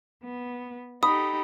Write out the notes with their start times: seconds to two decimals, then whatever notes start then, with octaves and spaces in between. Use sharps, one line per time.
0.24 B3
1.03 D#4 G4 A4 B5 D#6